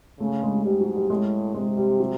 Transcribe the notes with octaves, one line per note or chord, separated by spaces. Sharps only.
C#3 A3
G#3
G#2 G3
F#3
G3
A2 G#3
C3 G#3
G3
F#3